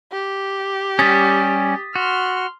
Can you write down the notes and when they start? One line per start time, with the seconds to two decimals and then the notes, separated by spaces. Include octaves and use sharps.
0.12 G4
0.99 G3 C#4 D#6 A6 B6
1.96 F#4 C6 F6